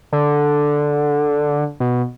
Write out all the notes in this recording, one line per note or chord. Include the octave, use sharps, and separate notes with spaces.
D3
B2